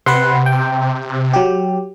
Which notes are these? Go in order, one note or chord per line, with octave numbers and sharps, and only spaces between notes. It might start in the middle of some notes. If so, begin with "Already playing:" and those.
C3 B4 F#5 C6
G5
F#3 G4